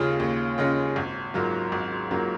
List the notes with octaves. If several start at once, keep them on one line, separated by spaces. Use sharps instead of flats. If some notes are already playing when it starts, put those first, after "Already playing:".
Already playing: D#2 C#3 G#3 C#4 F4
D#2
C#3 G#3 C#4 F4
G#1
G#2 F#3 A#3 F4
G#1
G#2 F#3 A#3 F4